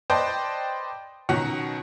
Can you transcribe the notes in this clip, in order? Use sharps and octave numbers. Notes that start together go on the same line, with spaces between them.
B4 C5 D5 D#5 G5 A5
B2 D#3 F#3 C#4 F#5